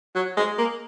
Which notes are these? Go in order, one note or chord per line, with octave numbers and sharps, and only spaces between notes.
F#3
G#3
A#3